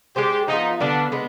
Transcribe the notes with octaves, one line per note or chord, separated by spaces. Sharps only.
G#3 D4 G4 G#4 C5
F3 B3 D#4 F4
D3 G3 B3 D4
G#3 B3